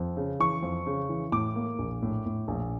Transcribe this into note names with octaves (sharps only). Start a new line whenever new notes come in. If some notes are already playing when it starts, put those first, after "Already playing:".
Already playing: F2
C#3
E3 C#6
F2
C#3
E3
A2 D6
A#3
A#1
A2
A2
A#1